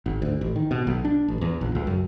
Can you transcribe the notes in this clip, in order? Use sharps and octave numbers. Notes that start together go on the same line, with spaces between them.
G#1
D2
A1
D#3
B2
B1
D4
A1
E2
A#1
C#2
F#2